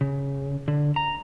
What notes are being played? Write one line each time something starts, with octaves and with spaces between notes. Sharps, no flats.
C#3
D3
A#5